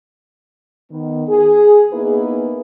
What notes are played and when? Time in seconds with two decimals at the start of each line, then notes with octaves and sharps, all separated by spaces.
0.91 D#3 B3
1.28 G#4
1.93 A#3 B3 D#4 E4 G#4 B4